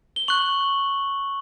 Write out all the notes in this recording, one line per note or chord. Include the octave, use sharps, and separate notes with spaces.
G7
C#6 F#6 F#7